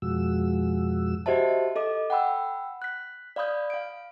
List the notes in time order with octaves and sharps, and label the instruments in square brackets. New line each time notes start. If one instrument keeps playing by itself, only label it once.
[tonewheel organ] F2 B2 F3 G#3 F#4 E6
[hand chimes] F#4 G4 C5 D#5 E5 A5
A4 D#5 D6
F#5 G5 B5 E6
F#6 B6
D5 F5 B5 D#6 G6
F5 D7